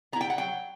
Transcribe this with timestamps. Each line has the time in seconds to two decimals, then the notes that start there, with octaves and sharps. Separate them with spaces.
0.12 B3 A#5
0.16 E4 G5
0.30 F#5
0.38 F#3 G5